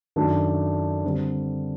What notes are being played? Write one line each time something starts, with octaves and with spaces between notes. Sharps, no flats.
F#2 D#3 F#3 A3 D4
D3 G3 C4